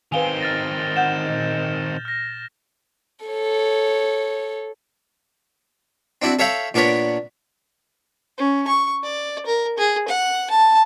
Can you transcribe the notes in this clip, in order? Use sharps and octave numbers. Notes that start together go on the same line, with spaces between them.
D#3 C4 B4 F5 G#5 F7 G7
F6 A6 A#6
F#5 G6 E7
A#2 D#5
F6 A#6
A4 C#5
C4 D4 E4 F#4
A4 C#5 E5 F5 G5 B5
A#2 B3 D4 A#4 C#5 B5
C#4
C#6
D5
A#4
G#4
F#5
A5